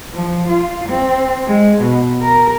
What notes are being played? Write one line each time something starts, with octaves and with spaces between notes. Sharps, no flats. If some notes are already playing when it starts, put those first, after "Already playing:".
F3
F4
C4
G#3
B2
A#4